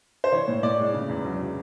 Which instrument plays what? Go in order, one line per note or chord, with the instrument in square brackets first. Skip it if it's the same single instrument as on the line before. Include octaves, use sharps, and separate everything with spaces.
[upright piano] C5
E3 C#5
A2
A2 D5
G#3
C#3
E2
F#3
C#3